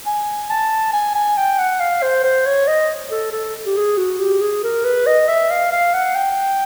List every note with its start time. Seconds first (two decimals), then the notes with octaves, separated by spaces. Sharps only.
0.06 G#5
0.50 A5
0.93 G#5
1.15 G#5
1.37 G5
1.59 F#5
1.80 F5
2.02 C5
2.24 C5
2.46 C#5
2.67 D#5
3.11 A4
3.32 A4
3.66 G4
3.76 G#4
3.97 F#4
4.20 G4
4.41 G#4
4.63 A#4
4.84 B4
5.06 D#5
5.28 E5
5.51 F5
5.72 F5
5.94 F#5
6.15 G5